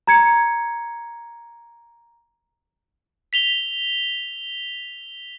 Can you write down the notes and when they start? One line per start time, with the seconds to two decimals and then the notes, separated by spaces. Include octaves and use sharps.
0.07 A#5 G#6 C#7
3.33 B6 F7 G7